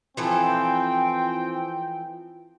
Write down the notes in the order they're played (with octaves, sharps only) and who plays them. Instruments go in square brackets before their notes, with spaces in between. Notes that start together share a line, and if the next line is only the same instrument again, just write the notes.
[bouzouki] E3 F3 A4 [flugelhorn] C4 [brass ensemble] G5